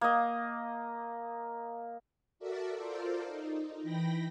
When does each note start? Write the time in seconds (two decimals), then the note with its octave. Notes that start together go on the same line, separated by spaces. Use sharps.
0.01 A#3 D#5
2.39 F#4 A4 A#4 D5 E5
2.76 F4 A4 A#4 C5 D5
3.25 D#4
3.83 E3 G5 B5 A#6